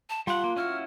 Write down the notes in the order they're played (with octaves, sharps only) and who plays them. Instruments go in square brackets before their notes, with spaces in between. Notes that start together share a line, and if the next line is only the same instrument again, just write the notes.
[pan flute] A5
[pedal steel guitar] G3 F#5 [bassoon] F4 [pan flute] C6
[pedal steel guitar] A#3
[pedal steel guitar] C#4 E4 F#4 [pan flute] F6